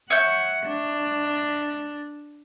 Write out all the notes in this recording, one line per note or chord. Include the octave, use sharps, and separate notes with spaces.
C#5 E5 F#5 G6
D4